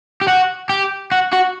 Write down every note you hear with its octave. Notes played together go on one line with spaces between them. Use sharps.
G4
F#4
G4
F#4
F#4